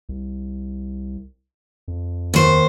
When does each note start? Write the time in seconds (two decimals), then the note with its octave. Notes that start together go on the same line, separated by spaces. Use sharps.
0.09 C2
1.88 F2
2.34 D#2 C5